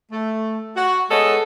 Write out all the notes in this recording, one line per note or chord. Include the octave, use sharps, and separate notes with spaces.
A3
F#4
G#3 B3 G#4 A4 C#5 D#5